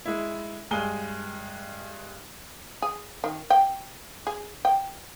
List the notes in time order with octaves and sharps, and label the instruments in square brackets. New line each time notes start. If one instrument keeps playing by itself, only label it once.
[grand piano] G#3 E4
G2 G#3 G#5 G7
[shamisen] G#4
D#3
G5
G#4
G5